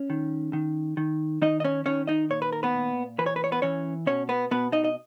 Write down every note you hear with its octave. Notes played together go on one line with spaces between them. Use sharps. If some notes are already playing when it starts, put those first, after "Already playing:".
Already playing: C#4
D#3
D#3
D#3
D#3 D#4 D#5
D#5
C#4 C#5
D#3 C#4 C#5
D#4 D#5
A#2 C#5
B4
A#4
B3 B4
A#2
E3 B4
C#5
B4
C#5
B3 B4
E3 C#4 C#5
B2 C#4 C#5
B3 B4
B2 B3 B4
D#4 D#5
D#5